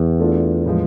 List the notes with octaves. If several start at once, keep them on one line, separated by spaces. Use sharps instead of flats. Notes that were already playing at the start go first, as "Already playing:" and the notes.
Already playing: E2
A3 D4 F4
A2 F3 G#3